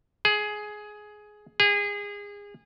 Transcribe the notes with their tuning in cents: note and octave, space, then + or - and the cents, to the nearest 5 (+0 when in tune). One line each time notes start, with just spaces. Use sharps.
G#4 +15
G#4 -25